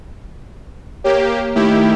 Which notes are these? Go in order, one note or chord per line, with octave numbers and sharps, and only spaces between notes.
A#3 G4 C#5
D#3 A3 E4 G4